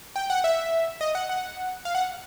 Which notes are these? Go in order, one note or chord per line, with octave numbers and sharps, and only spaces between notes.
G5
F#5
E5
D#5
F#5
F#5
F5
F#5